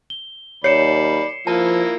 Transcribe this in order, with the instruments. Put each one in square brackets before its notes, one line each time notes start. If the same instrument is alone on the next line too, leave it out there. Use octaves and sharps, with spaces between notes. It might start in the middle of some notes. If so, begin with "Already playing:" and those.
[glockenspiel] G7
[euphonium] D#2 [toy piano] C#5 [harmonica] D5 B5 [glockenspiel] C7 C#7 E7
[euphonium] F3 [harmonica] A#3 E4 F4 [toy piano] A5